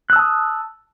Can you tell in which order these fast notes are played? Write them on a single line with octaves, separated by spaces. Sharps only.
F#6 E6 A5 D#6